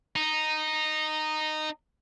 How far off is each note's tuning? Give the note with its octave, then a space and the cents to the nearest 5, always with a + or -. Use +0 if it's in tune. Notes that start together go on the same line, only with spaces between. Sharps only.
D#4 -10